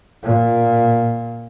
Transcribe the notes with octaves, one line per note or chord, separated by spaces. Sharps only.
A#2